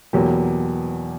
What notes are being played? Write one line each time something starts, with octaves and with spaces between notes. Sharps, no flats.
E2 B2 F#3 A#3 G4